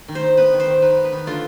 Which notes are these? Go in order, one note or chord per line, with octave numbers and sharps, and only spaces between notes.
D#3
C5
D#4
B3 B4
D#3
C5
D#3
D#4 B4
B3
B4
D#3
D3 F4